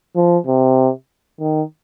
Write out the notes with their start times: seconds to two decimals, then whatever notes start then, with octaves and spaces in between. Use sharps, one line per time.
0.16 F3
0.47 C3
1.41 D#3